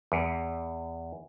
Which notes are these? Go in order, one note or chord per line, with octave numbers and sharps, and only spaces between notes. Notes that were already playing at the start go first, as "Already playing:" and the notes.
E2